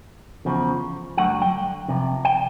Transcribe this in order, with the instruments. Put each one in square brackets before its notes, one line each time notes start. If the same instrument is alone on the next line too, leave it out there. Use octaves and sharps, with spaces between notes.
[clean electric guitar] E2 C#3 F3
G2 D3 F#3 A3 F#5
G5
F2 C3
G5